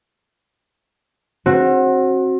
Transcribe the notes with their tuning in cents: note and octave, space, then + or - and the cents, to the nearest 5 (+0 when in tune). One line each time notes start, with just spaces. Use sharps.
C4 +35 F#4 +0